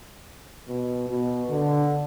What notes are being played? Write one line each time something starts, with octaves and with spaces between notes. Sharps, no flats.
B2
B2
D3